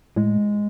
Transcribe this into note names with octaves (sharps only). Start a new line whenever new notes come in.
A2 G#3